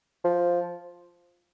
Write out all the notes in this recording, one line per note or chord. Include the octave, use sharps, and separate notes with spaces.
F3